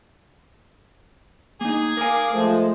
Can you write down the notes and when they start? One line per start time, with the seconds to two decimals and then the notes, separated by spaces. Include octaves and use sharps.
1.61 A#3 D#4 G#4
1.97 A#4 F5 G#5 D6
2.32 F3 G#3 A3